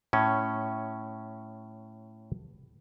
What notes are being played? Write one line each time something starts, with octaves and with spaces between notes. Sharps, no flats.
A2 C#4